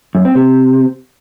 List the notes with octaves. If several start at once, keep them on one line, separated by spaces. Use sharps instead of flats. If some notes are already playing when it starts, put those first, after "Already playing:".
F#2
C4
C3